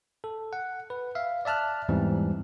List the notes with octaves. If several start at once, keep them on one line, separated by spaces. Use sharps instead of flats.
A4
F#5
B4
E5 F5
D5 E5 A5 F6 F#6
E2 G#2 E3 G3 C4